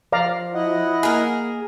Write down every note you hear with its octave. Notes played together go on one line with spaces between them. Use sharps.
F3 D5 F5 A#5
E4 D#5 F#5
A#3 G#4 A#4